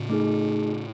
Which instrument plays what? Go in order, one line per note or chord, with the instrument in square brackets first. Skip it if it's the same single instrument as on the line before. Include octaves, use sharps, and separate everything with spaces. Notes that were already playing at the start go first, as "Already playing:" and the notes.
Already playing: [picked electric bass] A2 C#3
[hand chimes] A3 D#4 G#4